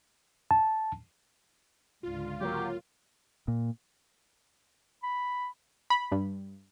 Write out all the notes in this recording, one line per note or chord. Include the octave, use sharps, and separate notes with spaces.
A5
C#2 G#2 D3 F4
F#3 A#3 G4
A#2
B5
B5
G2